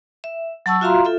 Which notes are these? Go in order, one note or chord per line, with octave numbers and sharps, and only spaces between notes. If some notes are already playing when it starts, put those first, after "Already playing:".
E5
F#3 F#5 A5 C#6 E6
F4 F#4 E5 F5 A#5 C6
F4 A4 E5